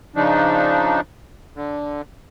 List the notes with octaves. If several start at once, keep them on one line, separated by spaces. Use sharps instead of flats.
C#3 F3 D4 D#4
D3